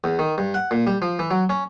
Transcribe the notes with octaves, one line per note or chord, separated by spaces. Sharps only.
E2
D#3
G2
F#5
A#2
G3
F3
E3
F#3
C#4